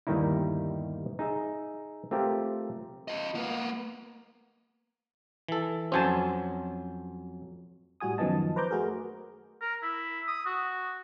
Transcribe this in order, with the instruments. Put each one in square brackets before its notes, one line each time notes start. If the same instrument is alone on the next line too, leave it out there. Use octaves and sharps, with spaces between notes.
[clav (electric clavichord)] G1 D#2 D#3 G3 D#4 E4
D#4 G#4 E5
A3 C4 F4 G4 A#4
[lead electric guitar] F4 D#5
A#3 B3
[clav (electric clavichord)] E3 A4
[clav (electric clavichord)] F2 F#3 C#4 [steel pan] C5 G#5 A5
[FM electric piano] A2 G3 F#4 G#5 D#6
F#2 D#3 F3 B3 D#5 A5
B4 C5 A#5 D6 G6
A3 F#4 G#4 A#4
[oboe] A#4
E4
D#6
F#4